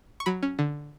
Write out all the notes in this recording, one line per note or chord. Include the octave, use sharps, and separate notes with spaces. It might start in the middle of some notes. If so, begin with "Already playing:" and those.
C#6
F#3 B5
C#4
D3